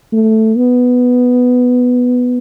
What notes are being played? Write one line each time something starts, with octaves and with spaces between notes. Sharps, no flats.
A3
B3